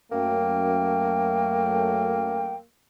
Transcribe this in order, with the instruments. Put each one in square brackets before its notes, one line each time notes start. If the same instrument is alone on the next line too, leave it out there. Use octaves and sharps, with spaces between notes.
[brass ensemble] F#2 A3 [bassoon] A#3 [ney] G5